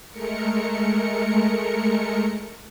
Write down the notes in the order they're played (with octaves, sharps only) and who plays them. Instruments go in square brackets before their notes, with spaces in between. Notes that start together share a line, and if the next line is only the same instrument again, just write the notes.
[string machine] G#3 A3 A#4 C#7